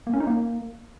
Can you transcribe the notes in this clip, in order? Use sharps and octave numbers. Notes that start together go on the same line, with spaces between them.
A#3
C#4
D#4
A#3